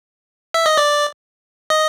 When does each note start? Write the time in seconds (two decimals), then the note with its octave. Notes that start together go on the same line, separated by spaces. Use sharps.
0.54 E5
0.66 D#5
0.78 D5
1.70 D#5